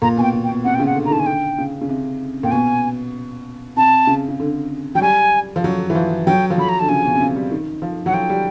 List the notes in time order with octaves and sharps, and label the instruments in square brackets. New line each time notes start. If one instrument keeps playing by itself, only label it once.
[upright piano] A#2 [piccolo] A#5
[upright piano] B2 [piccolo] G#5
[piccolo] G5
[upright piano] B2
[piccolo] G5
[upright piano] B2
[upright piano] C3 [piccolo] F#5
[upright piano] C3 [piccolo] G5
[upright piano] C#3
[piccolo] F#5
[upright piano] D3
[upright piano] D3 [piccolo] A#5
[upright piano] D#3 [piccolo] A5
[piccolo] G#5
[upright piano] D3 [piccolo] G5
[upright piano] C#3
C#3
C3
[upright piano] A#2 [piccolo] G5
[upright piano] B2 [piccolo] G#5
[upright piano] C3 [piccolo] A5
[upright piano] C#3
C#3
D3
[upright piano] F#3 [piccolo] G5
[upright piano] G3 [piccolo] G#5
[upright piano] F3
F#3
E3
F3
[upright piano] F#3 [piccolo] G5
[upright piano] F3
[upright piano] F#3 [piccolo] B5
[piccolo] A#5
[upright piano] D3 [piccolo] A5
[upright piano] C#3 [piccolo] G#5
[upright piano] B2
C3
C#3
G3
D#3
F3
[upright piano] F#3 [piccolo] F#5
[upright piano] F3 [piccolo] G5
[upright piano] G3